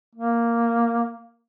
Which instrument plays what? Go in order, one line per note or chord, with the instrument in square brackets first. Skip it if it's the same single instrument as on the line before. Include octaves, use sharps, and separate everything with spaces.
[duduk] A#3